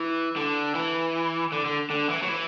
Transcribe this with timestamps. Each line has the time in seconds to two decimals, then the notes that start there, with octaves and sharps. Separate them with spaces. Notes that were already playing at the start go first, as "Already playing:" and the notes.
Already playing: E3
0.36 D3
0.75 E3
1.52 D3
1.65 D3
1.90 D3
2.10 E3
2.22 F#3
2.29 E3